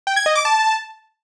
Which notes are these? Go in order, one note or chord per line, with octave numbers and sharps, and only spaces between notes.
G5
G#6
D#5
D6
A5